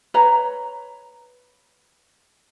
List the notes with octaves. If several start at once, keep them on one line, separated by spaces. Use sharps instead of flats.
B4 C#5 A#5